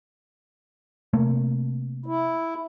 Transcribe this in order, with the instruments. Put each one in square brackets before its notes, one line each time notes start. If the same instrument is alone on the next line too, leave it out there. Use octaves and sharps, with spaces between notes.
[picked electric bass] C3 A3 A#3
[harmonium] E4